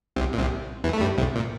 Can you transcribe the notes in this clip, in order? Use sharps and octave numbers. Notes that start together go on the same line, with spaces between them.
C2 C3
A#2
C2 C3
E2 E3
A3
G2 G3
C2 C3
A#2